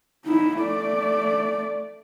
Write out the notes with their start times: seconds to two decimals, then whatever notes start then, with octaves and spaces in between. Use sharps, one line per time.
0.25 D#4 E4
0.58 A3 D5